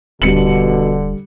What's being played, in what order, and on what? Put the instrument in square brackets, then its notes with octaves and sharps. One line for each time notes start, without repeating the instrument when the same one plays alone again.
[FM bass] D#1 [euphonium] B2 [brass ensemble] D3 [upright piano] G3 C#7 F#7